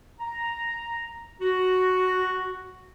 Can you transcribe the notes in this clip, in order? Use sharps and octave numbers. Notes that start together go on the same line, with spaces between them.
A#5
F#4